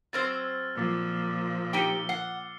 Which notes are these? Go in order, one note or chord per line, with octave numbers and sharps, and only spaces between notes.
F#3 C4 C5 E6 F6 A6
A#2 F3 D6 E6 A6
D#4 G4 G5 C#7 G7
F#5 C7